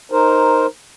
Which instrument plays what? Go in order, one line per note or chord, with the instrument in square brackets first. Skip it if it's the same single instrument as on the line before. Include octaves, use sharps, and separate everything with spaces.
[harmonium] D#4 A#4 C5